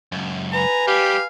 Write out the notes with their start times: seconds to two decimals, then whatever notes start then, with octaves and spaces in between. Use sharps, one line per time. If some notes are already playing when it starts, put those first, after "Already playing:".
0.12 C#2 F#2
0.53 B4 G#5 A#5
0.87 G3 G4 F5